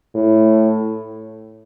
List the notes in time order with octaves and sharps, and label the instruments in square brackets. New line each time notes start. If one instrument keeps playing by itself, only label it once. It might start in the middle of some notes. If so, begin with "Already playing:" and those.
[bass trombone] A2